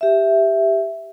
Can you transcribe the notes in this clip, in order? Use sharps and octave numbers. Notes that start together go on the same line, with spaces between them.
G4 E5